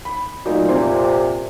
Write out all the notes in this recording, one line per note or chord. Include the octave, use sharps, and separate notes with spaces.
B5
A#2 F#3 A3 D#4
F2 C3 C6